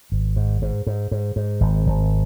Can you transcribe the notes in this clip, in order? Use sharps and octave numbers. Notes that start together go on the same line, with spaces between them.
G#1
G#2
G#2
G#2
G#2
G#2
G#1
G#1